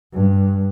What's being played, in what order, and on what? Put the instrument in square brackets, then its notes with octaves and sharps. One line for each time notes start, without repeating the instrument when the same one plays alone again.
[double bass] G2